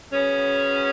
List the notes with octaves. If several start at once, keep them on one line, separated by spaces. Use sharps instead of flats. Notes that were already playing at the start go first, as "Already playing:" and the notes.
C#3 F#3 B3 C#4